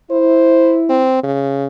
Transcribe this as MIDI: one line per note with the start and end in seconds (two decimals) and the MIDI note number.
0.11 1.07 64
0.11 0.79 72
0.90 1.20 60
1.23 1.67 49